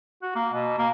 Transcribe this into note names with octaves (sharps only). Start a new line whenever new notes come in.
F#4
A#3
B2
A#3